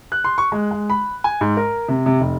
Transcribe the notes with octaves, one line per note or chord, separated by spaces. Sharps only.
F#6
C6
C#6
G#3
G#3
B5
G#5
G#2
A#4
C3
C3
F1